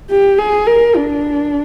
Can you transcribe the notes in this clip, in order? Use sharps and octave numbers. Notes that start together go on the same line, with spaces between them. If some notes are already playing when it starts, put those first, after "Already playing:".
G4
G#4
A#4
D4